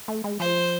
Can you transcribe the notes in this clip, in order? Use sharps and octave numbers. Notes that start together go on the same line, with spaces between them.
A3
G#3
F3 C5